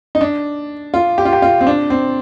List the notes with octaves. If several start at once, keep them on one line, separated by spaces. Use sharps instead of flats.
D#4
D4
F4
G4
F4
G4
F4
C4
D4
C4